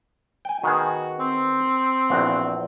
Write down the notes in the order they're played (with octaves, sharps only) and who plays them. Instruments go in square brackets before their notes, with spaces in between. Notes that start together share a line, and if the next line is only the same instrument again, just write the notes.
[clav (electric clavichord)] G5 G#5
[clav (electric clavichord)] D#3 B3 G#4 [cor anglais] F#4
[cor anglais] C4
[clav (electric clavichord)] A#1 E2 F#4